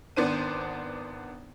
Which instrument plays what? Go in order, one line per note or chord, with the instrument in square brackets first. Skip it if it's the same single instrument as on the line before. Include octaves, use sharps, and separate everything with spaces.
[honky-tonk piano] G#1 B3 D4 C5 D#7